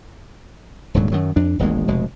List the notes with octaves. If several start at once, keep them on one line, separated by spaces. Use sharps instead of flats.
D#1 D2 G#2 F#3
F#2 D#3 F#3
F2 D4
D#1 A1 D#2 G#3
F1 B2 G#3